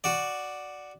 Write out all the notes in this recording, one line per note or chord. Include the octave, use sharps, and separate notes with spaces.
F#4 D5